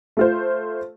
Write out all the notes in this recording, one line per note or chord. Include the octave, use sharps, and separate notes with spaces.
A3 F4 C5